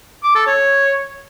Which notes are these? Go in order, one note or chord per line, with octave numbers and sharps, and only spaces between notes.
D6
A4
C#5